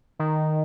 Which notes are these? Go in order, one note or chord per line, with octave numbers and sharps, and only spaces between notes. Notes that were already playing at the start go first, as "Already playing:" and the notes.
D#3